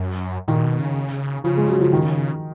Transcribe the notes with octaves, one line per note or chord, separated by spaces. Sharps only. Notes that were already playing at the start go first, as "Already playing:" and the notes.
Already playing: F#2
A#2 D#3
B2
C#3
C#3 F3
G#3
F#3
F3
D#3